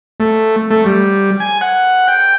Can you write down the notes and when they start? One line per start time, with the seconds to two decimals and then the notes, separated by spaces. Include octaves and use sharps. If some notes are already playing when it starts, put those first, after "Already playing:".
0.20 A3
0.71 A3
0.86 G3
1.40 G#5
1.61 F#5
2.08 G5